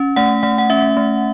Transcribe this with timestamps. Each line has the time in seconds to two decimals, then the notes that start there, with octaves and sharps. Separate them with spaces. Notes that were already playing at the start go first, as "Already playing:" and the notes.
Already playing: C#4
0.16 A3 F#5
0.43 A3 F#5
0.58 F#5
0.70 C#4 E5
0.97 A3